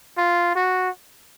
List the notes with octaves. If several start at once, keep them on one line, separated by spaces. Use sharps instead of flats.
F4
F#4